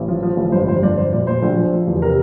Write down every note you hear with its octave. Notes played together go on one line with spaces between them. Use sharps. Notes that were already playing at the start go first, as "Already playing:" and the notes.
Already playing: A1
F3
F3
A1
G1 C5
F2 C5
G1 D5
F2 C5
A#2 D5
A#2 C5
A#1
F3
F3
E2
C3 A#4